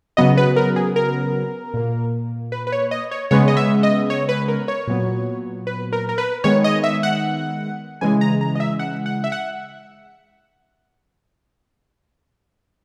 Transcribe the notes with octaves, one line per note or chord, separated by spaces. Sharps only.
C#3 F#3 B3 D#5
B4
A#4
G#4
A#4
A#2 A#3
B4
B4
C#5
D#5
C#5
C#3 G#3 B3 C#5
D#5
E5
D#5
C#5
B4
A#4
C#5
A#2 F#3 B3
B4
A#4
A#4
B4
D#3 G#3 B3 C#5
D#5
E5
F#5
C#3 E3 G#3 G#5
A#5
A#5
D#5
E5
F#5
F#5
E5
F#5